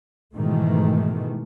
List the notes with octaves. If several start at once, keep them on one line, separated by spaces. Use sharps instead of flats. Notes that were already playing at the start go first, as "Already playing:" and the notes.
G#2 B2 D#3 E3 G#3 A3